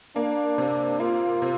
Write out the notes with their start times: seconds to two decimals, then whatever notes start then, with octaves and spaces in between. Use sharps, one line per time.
0.16 A#3 D4
0.58 C3
1.00 A#3 F4
1.42 C3